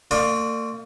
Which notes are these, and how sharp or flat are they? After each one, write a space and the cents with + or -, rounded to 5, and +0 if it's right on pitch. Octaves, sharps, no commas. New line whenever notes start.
A#3 -45 F4 +20 D5 +20